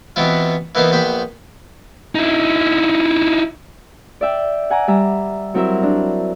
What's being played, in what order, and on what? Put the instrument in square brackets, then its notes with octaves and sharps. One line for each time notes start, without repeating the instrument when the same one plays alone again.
[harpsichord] B2 E3 B3 C4 E4 F4
E3 A#3 B3 D#4 F4 C5
A#1 B3 C5 G5 B5
[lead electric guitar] D#4 E4
[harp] D5 E5 G5
F#5 G#5 A#5 D6
G3 E5 A#5
F#3 C4 E4 A#4 E5
D4